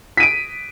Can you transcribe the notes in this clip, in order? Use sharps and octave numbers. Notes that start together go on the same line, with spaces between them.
B6 D7 D#7